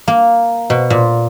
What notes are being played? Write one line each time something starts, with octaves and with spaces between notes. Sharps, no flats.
A#3
B2
A#2